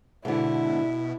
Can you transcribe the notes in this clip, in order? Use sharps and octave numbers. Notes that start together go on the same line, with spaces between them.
G#2 B2 D3 E4